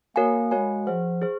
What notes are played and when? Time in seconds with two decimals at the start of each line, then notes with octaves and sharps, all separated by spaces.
0.16 A#3 F#4 A#4 C#5 F5 G#5
0.51 G#3 F#4 A#4 C#5 F5 G#5
0.87 F3 G#4 C5 F#5
1.22 G#4 C5